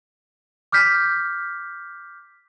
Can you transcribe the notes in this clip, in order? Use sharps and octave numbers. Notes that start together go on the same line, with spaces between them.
D6 F6 G6 B6